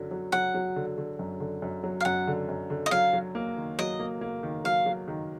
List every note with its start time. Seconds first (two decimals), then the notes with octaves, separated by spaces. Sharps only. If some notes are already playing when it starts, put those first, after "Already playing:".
Already playing: F#2 D3 F#3
0.11 F#3
0.32 F#3 F#5
0.55 F#3
0.76 D3
0.98 D3
1.19 F#2
1.40 D3
1.62 F#2
1.84 F#3
2.00 F5
2.05 F#2 F#5
2.27 D3
2.49 F#2
2.70 D3
2.86 D#5
2.91 F#3 F5
3.13 F#3
3.35 A#3
3.57 D#3
3.79 F#3 D#5
4.00 A#3
4.21 A#3
4.43 D#3
4.64 F#3 F5
4.86 F#3
5.08 D#3